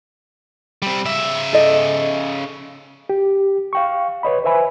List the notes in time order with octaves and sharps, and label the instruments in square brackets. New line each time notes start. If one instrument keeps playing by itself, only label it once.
[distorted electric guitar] G3 C4
C#3 E5
[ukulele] A4 D#5
[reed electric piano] G4
F5 G5 C#6
B4 C#5 D#5 B5
B4 C5 E5 G#5 B5